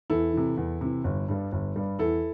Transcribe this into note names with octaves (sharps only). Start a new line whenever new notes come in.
E2 E4 A4
C3 E3
E2
C3 E3
G1
G2 G3
G1
G2 G3
E2 E4 A4